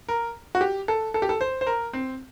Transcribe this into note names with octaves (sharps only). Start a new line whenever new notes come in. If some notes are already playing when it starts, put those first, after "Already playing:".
A#4
F#4
G4
A4
A4
G4
A4
C5
C5
A#4
C4